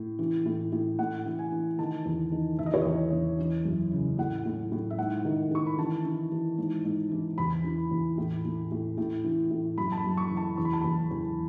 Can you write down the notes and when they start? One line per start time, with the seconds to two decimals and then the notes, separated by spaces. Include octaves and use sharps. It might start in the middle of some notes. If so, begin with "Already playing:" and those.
Already playing: A2
0.19 E3
0.46 A2
0.72 A2
0.99 A2 F#5
1.25 E3
1.39 G#5
1.52 E3
1.79 D#3 A5
2.05 E2
2.32 D#3
2.58 E2 E5
2.66 D#5
2.74 C#5
2.81 E2 D#5
3.12 E2
3.39 E3
3.65 F#2
3.92 C#3
4.18 A2 F#5
4.45 A2
4.72 A2
4.90 E5
4.98 G#2 F#5
5.25 D#3
5.51 D#3 C#6
5.67 B5
5.78 E3 A5
6.05 E3
6.32 E3
6.58 G#2
6.85 G#2
7.11 E3
7.38 E2 B5
7.64 E3
7.91 E2
8.18 A2
8.45 A2
8.71 A2
8.97 A2
9.24 E3
9.51 A2
9.78 F#2 B5
9.92 A5
9.98 B5
10.04 F#2
10.17 C#6
10.30 E3
10.37 A5
10.57 E2 C#6
10.65 B5
10.73 A5
10.81 E2 B5
11.11 E2